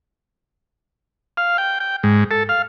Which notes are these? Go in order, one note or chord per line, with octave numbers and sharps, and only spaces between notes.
F5
G5
G5
G#2
A4
F5